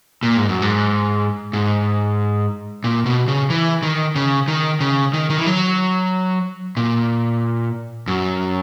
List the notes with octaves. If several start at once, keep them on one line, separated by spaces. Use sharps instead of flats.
A#2
G#2
F#2
G#2
G#2
A#2
B2
C#3
E3
D#3
C#3
D#3
C#3
D#3
D#3
E3
F#3
A#2
F#2